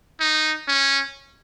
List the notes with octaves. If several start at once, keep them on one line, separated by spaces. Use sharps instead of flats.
D#4
C#4